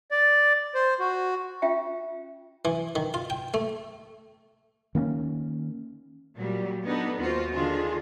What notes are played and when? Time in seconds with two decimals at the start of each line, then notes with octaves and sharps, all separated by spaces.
0.11 D5
0.75 C5
1.00 F#4
1.62 C#4 F4 E5 G5
2.65 E3
2.96 D#3
3.14 F4
3.30 G5
3.54 A3
4.95 D#3 A#3 B3 C#4
6.37 A#2 F#3 G3
6.85 B3 D4 D#4 A4
7.19 D#2 B3 F4 F#4 C5
7.53 D3 D#3 D4 F4 G#4